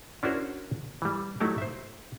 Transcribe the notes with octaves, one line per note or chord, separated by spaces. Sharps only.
C#4 D4 E4 F#4 A#4 C5
E3 G3
F#3 A3 D#4 E4 G4
C5 E5